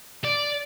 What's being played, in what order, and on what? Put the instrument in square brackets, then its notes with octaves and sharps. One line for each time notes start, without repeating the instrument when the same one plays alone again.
[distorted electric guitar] D5